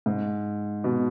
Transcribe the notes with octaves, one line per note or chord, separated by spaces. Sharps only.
G#2
B2